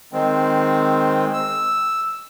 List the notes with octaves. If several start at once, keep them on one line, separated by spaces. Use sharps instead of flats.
D#3 G#3 C4
E6